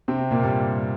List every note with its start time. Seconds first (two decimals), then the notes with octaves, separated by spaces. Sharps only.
0.08 C3 C4
0.31 A#2 A#3
0.43 G2 G3